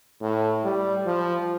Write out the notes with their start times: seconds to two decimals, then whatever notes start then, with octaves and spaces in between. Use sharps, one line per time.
0.21 A2
0.64 G3
1.06 F3